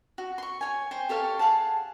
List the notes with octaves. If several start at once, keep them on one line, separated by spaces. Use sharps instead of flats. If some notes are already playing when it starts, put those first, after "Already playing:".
F#4
C6 C#6
C#5 G#5
C5 G5 G#5
G4 A4 C#5 F5
G#4 F5 F#5 A5